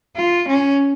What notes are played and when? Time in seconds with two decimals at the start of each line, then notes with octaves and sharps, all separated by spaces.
0.16 F4
0.48 C#4